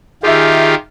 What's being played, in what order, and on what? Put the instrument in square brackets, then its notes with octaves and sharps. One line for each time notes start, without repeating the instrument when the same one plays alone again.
[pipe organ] D#3 F4 G4 [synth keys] G#4 E5